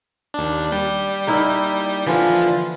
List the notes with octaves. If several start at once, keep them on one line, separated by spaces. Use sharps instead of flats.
D#2 D4
G3 G6
A#3 D#4 E4
D3 E3 F3 F4